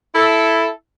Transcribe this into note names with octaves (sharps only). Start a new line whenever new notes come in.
E4 A4